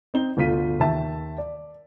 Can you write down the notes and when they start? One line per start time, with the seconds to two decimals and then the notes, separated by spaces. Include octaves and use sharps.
0.14 C4 D#4 G7
0.37 G1 D2 F4 B6 D#7
0.80 D#2 D#3 E5 A5
1.38 D5